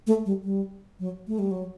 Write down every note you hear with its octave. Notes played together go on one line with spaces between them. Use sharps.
A3
G3
G3
F#3
A3
G3
F#3